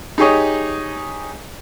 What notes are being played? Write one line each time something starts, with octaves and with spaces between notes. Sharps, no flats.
D#4 G4 G#4 C#5 D#5